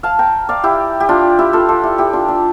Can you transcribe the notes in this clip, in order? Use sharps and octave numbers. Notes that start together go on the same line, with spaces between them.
F5 A5
G5 A#5
D5 F5
E4 G4
G4
D4 F4
E4 G4
F4 A4
F4 A4
E4 G4
E4 G4
D4 F4
D4